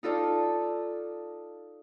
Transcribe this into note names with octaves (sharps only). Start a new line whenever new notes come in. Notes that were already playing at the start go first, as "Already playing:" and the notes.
D#4 F4 A4 D5 A5